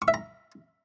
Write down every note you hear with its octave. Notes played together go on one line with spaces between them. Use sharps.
C#6
E5
A#5